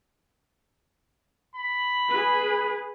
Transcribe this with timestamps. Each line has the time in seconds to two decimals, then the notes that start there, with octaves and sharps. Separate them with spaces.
1.55 B5
2.09 G#4 B4